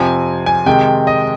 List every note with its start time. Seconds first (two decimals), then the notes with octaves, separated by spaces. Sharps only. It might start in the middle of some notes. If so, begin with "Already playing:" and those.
Already playing: F2 C3 F3 C4 G#5
0.46 G#5
0.66 C3 D#3 G#3 G5
1.07 D#5